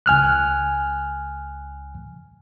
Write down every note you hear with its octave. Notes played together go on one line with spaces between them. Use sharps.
C#2 G#5 F6 F#6